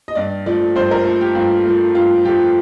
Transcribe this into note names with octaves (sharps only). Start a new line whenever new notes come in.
D#5
G2 D5
F3 A3 D5
G2 C5
A#4
F3 A3 A4
G4
G2 F4
F3 A3
G2 F4
F3 A3 G4